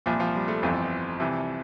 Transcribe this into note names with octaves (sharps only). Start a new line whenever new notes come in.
C2 A#2 F3
F3
G3
A3
G1 F2 E3 F3
C2 C3 E3